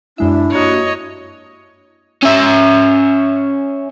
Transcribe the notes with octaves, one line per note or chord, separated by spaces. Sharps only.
F#2 G#3 D4 E4 E5
G2 A#3 F#4 C#5 D#5
C#4 E5